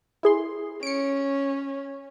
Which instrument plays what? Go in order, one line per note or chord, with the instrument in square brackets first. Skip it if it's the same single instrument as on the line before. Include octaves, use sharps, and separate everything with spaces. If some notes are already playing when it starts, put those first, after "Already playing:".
[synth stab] E4 G#4 C6
[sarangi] C#4 [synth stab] C#7 D7